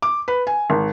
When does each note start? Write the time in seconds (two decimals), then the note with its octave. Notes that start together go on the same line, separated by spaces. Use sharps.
0.02 D6
0.28 B4
0.47 G#5
0.70 G#1